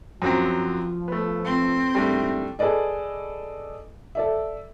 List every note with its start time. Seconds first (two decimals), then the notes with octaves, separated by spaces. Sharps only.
0.22 F#2 F3 F#3 C4
1.08 A3 B3
1.44 C4
1.95 G#1 E2 G3 A3 D4 E4
2.59 G#4 A4 B4 D5 D#5
4.15 A4 D5 E5